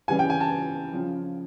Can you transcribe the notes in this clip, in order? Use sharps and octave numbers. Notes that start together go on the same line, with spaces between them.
C#3 E3 G3 G#5
G5
G#5
A5
C#3 F3